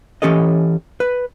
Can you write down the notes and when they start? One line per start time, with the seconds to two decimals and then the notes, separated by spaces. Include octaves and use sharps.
0.22 E3 C#4 G4 A4 D#5
1.00 B4